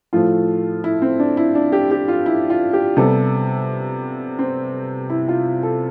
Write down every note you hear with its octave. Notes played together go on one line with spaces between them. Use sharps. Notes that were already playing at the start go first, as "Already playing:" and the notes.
A2 F3 A3 F4
E4
C4
D4
E4
D4
G4
G4
F4
E4
F4
G4
C3 G3 B3 A4
C4
E4
F4
A4